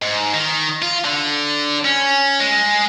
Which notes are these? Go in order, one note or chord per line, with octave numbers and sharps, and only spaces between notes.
G#2
D#3
F4
D3
C#4
G#3